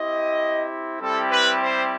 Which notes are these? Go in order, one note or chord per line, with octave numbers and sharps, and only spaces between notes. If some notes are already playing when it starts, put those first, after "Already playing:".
Already playing: C4 E4 G4 D#5
G3 C4 E4 G4 A4
B4
C5